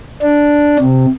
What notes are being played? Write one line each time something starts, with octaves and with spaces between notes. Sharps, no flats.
D4
C3